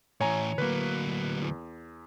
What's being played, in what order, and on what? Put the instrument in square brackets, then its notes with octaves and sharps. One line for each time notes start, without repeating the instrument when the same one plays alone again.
[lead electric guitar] A2 E3 [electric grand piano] C#5 G#5 A#5
[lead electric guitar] D2 F#3 [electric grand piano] A#3 B4
[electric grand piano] E2